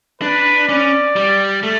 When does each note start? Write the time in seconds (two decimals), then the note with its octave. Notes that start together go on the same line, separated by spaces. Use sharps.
0.22 D4 B4
0.68 C#4 D5
1.16 G3
1.63 A3